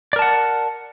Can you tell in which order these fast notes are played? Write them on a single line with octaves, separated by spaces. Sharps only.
D5 A#4 A5 F#5